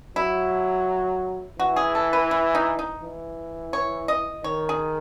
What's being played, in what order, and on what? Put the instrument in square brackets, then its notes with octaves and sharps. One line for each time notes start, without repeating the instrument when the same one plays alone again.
[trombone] F#3 [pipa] E4
[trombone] E3 [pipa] F#4
[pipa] G#4
A4
B4
E4
D#4
D#4
[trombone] E3
[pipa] C#5
D#5
[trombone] D#3 [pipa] C#5
[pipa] G#4